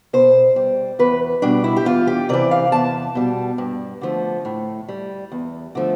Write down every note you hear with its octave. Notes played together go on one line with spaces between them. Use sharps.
B2 C5
G3
E2 B4
B2 G3 D4
E4
G4
E2 F4
G4
C3 E3 D5
F5
E2 A5
B2 G3
G2
D3 F3 A3
A2
G3
E2
D3 F3 A3